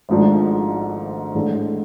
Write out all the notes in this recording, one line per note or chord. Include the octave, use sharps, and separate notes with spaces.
G#1 G#2 F3 A3 D4
A2 E3 G#3 D4 A4